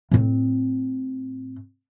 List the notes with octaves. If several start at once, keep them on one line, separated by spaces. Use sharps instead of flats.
A2 C4